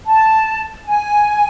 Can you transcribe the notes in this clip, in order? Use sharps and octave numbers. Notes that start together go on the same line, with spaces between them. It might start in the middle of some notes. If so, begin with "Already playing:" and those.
A5
G#5